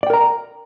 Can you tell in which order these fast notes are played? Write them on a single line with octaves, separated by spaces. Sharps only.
D5 G5 A#4 A#5